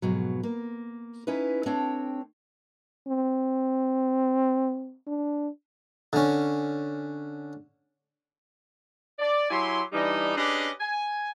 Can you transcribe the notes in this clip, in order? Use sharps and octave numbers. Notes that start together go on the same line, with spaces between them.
F2 G#2 B2 F#3
A#3
C#4 D#4 E4 B4
A3 C4 D4 C#5 G5
C4
D4
D3 C#4
D5
F#3 E4 G4 G#5 C6
E3 G3 D4 D#4
C#4 D4 G4 G#4 B4 D#5
G#5